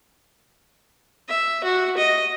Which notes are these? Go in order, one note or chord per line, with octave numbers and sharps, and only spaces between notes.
E5
F#4
D#5